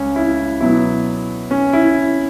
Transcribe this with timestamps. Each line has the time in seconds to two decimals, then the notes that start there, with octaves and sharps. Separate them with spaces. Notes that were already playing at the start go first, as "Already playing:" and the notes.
Already playing: C#2 C#4
0.16 E4
0.61 B2 F#3 B3 E4
1.51 C#4
1.73 E4